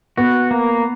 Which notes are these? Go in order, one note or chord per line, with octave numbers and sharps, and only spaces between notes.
B3 F#4
A#3